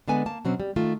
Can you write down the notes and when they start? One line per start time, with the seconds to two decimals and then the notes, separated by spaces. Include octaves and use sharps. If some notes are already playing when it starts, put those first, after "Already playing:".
0.08 D3 G#3 B3 A4 B4 G#5
0.26 A#3 A5
0.45 B2 F#3 C4 C#4
0.60 G3
0.76 D#3 A3 F4